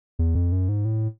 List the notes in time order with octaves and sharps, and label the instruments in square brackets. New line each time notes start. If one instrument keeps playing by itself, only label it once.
[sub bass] E2
F2
F#2
G#2
A2